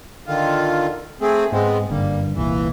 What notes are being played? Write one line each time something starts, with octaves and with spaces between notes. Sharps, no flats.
D3 D#3 F4
A3 C4 G#4
G#2 G#3 B3 C4
F#1 G2 D3 G3 A#3
D#1 C2 A#2 E3